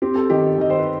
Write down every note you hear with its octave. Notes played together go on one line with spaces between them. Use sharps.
C4 G4
A4
D#3 G4
D#3 D#5
C5
B4